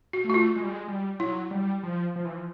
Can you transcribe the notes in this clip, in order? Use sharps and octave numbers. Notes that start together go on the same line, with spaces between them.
F#4
A3
F#4
F4
G#3
G3
G#3
G3
F#3 E4
G3
F3
F3
E3
F3